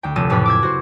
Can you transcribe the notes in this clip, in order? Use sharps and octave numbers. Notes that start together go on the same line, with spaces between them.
D2 G5
F1 A4 D#7
F#1 F2 A2 G4 B4 G5
D6 E6 G#6
F#4 C5